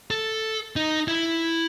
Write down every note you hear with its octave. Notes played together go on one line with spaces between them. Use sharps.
A4
D#4
E4